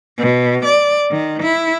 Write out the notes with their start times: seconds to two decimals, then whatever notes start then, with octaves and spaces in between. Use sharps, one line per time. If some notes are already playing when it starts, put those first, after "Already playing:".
0.18 B2
0.65 D5
1.11 D#3
1.42 E4